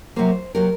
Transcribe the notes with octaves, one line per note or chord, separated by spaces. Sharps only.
C3 F#3 A#3 C5
C3 F#3 A#3 A#4